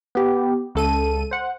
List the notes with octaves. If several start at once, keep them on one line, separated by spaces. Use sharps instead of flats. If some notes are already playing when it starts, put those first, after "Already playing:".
B3 G4
C#2 A4 D#7
C5 F#5